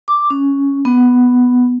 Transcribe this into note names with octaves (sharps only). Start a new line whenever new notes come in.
D6
C#4
B3